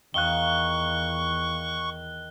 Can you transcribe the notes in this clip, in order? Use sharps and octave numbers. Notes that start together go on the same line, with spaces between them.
E2 D#3 F5 C#6 F#6 G7